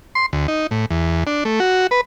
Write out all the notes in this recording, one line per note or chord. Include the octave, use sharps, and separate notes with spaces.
C6
D2
D#4
A2
E2
D4
A3
F#4
B4